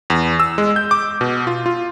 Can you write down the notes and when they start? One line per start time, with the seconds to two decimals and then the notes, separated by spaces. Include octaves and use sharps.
0.10 E2
0.40 E6
0.58 G#3
0.76 G6
0.91 D6
1.21 B2
1.47 F4
1.66 F4